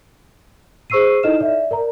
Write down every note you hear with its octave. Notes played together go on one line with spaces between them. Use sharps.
G#4 C5 C#6 E6 C7 D#7
D#4 E4 A4 D#5 F6 E7
D5 E5
A#4 D5 A#5